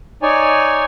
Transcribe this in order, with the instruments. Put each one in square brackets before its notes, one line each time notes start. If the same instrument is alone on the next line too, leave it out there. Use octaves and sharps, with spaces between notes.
[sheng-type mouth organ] D#4 C#5 D5 G#5